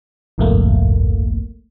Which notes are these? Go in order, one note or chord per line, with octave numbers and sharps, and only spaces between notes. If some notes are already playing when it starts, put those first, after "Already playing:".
G1 C2 F2 G#2 A3 A#3